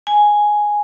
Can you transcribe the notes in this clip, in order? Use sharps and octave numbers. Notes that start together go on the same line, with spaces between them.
G#5